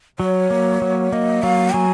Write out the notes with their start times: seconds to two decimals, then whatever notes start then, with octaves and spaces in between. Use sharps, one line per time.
0.19 F#3 C#5
0.50 A#3
0.82 F#3
1.12 A#3 D#5
1.43 F#3 F5
1.74 F#3 G#5